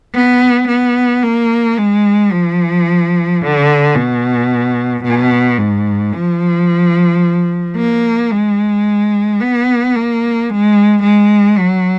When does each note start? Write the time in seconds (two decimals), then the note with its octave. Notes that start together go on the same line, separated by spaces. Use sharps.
0.14 B3
0.68 B3
1.23 A#3
1.78 G#3
2.32 F3
3.41 D3
3.95 B2
5.04 B2
5.58 G#2
6.14 F3
7.76 A#3
8.31 G#3
9.41 B3
9.95 A#3
10.50 G#3
11.03 G#3
11.58 F#3